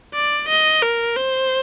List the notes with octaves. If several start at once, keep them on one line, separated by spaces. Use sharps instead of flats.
D5
D#5
A#4
C5